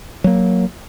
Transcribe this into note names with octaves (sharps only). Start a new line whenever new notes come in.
F#3 A#3